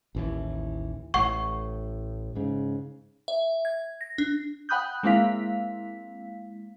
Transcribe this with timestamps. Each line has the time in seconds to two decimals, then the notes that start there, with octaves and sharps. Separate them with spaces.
0.15 A1 D#2 E3
1.14 A1 A2 F#5 C#6
2.35 G#2 C#3
3.28 E5
3.65 G#6
4.01 A#6
4.18 D4
4.69 F#5 G5 B5 D#6 F#6 G6
5.03 G#3 A#3 C4 E4 F5 B6